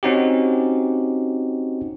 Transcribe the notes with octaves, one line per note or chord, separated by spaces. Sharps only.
C4 C#4 D#4 F#4 G4